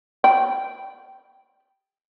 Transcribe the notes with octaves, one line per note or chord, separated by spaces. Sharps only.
G5 B5